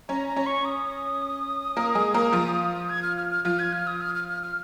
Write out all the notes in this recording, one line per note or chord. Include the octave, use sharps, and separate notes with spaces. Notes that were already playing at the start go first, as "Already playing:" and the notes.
C#4 C#5 A#5
A#5
C#4 C#5
C#6
D#6
A#3 A#4
G#3 G#4
A#3 A#4
F3 F4
G#6
F6
F6
F6
F3 F4 F6
G#6
F6
D#6
F6
F6
F6
F6